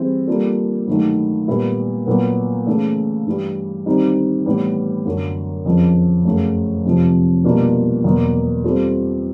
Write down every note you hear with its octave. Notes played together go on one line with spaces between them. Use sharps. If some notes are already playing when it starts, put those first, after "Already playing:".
Already playing: E3 G3 C4 E4 G#4
G3 A#3 D4 F4 A4
G2 D#3 F#3 A3
A#2 G3 B3 E4
A#2 F#3 B3
C#3 E3 A3
G2 E3 G3
D#3 G3 C4 D#4
A2 E3 G3 B3
F#2 D3 F#3
F2 C#3 F3
F#2 C#3 F#3 A3
F2 C3 F3
B2 G3 A#3 D4 F4
E2 B2 F#3 A#3
G3 C4 F4 A4